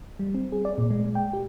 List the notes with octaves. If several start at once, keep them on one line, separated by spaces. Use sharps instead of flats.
G3
C4
G#4
D5
A#2
G#3
G5
G4